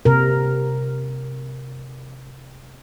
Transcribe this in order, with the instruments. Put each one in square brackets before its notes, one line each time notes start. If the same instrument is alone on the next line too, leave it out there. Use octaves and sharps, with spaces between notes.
[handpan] C3 A#4